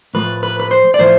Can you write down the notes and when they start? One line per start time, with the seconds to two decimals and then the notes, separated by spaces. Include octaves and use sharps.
0.14 A2 F3 A3 B4
0.43 B4
0.60 B4
0.71 C5
0.94 D5
0.99 A2 F3 A3 C5